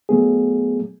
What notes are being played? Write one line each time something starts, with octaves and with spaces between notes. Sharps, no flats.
F#3 A3 B3 G#4